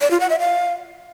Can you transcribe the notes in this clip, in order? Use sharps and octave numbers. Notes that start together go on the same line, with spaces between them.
D5
F4
F#5
E5
F5